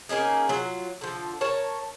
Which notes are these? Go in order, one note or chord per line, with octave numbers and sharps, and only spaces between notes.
A#3 C#4 D#4 G#4
F#3 F4
D3 F3
A#4 C#5 A5